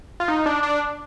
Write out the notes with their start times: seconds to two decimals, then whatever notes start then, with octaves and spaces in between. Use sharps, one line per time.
0.20 F4
0.28 D#4
0.46 D4
0.63 D4